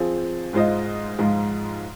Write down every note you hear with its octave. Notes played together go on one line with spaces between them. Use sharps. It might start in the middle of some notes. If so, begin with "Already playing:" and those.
Already playing: F3 C4 G#4
G#2 G#3 F4 C5 D#5
G#2 F3 G#3 F4